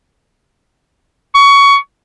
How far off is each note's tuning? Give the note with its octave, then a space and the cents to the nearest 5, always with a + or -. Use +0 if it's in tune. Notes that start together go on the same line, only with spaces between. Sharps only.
C#6 +20